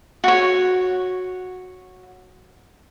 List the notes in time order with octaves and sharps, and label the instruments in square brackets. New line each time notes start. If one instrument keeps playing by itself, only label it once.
[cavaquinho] F#4 C#5